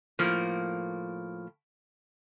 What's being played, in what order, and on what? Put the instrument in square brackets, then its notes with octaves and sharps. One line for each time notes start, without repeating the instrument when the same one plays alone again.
[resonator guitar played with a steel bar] A2 F3 A#3